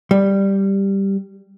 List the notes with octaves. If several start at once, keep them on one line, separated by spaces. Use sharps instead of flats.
G3